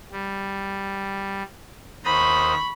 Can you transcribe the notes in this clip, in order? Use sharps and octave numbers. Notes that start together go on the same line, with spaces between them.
G3
D#2 C5 B5 C#6 D#6